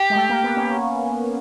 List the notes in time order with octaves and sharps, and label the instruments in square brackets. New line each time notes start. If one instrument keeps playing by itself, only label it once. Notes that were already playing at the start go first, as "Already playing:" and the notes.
Already playing: [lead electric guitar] G4
[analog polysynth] G#3
A3
A#3
B3
C#4